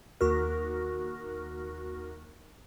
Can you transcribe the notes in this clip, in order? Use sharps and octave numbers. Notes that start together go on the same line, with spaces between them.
D#2 F#4 A#4